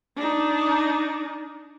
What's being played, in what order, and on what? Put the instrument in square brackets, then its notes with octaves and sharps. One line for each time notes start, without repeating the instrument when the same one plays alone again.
[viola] D4 D#4